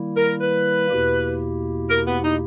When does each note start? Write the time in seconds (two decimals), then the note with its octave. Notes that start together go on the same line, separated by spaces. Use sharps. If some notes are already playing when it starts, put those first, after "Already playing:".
Already playing: D#3 G3 A#3 E4
0.16 A#4
0.40 B4
0.90 E2 B2 A#3 E4 G4
1.89 A#4
2.07 B3
2.23 D#4